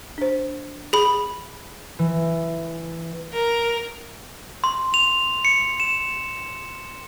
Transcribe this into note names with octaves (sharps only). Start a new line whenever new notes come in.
D4 C5
G#4 B5
E3
A#4
C6
F7
C#7
E7